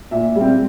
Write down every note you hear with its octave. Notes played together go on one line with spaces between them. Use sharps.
A#2 E5
G3
C4